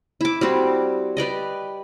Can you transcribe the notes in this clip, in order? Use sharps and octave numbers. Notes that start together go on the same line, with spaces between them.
E4 D6
G3 C4 F#4
G4 B4 D5 D#5